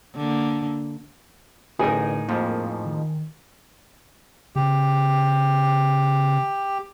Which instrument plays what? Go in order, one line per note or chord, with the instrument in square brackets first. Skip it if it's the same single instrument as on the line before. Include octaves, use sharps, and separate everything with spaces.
[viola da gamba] D3 A#3
[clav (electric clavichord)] A1 [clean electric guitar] A2 D#4 A#4 [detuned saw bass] D3 [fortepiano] G#4 D#6
[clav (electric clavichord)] F2 G#2 F3 [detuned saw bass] A#3
[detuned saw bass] D#3
[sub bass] C#3 [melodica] G4